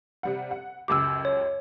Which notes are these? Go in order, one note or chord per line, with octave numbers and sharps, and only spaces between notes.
C3 G3 F#5
F#5
C#2 F#2 G4 D6 E6
C#5